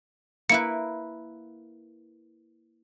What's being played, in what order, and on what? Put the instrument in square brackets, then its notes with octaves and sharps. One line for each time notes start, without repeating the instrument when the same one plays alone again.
[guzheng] A#3 E4 B4 [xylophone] C#7